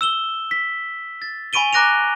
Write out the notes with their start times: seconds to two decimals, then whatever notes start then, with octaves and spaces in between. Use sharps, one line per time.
0.01 E6 E7 G7
0.51 B6
1.22 A6
1.53 G#5 B5 C#6 D7 D#7 G7
1.73 A#5 D6 F#6 A#6 D7 F7